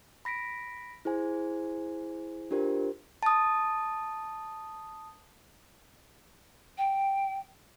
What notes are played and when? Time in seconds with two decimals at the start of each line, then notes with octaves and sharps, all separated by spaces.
0.25 B5 A#6 B6 D7
1.05 E4 G#4 C5 G#5
2.51 D4 F4 G4 A#4 C5
3.23 A5 D#6
6.77 G5